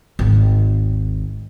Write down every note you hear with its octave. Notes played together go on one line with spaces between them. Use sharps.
G#1 D#2